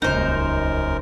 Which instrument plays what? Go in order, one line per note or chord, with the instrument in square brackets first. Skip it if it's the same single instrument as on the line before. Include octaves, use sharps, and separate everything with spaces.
[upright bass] D#1 C#2 [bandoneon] F#2 A#4 [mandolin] D#4 C5